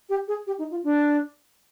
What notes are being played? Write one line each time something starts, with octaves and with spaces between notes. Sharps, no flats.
G4
G#4
G4
D#4
F4
D4